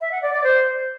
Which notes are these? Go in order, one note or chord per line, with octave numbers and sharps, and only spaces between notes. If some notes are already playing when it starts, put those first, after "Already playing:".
E5
F#5
D5
D5
C5